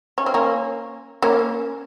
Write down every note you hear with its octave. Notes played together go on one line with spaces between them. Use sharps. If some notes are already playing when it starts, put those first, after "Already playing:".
C#4
C4
A#3 C#4
A#3 C#4